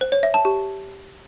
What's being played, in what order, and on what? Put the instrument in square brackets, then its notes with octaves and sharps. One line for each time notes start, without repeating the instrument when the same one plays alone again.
[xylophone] C5
C#5
E5
A5
G4